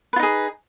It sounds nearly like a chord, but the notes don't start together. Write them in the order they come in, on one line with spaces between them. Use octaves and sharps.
B4 F4 D#4 G#4